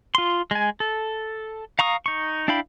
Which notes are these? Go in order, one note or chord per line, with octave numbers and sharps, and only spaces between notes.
F4 C6
G#3 G#5
A4
F5 A#5 C#6 D#6
D#4 C#6
D4 E4 F5 G5 B5